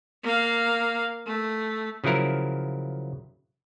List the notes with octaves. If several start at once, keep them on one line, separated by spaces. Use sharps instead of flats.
A#3 F5
A3
C#3 F3 F#3 E4 A#4